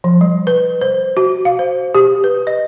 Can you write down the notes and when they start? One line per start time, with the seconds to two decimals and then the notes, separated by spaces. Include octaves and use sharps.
0.04 F3
0.21 G3
0.47 B4
0.81 C5
1.17 F#4
1.45 F5
1.59 C5
1.95 G4
2.24 B4
2.47 D#5